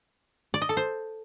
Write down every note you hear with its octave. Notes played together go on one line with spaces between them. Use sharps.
D5
D#5
A4
C5